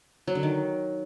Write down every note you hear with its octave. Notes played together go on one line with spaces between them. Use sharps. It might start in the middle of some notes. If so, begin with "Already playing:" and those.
F#3
D3
D#3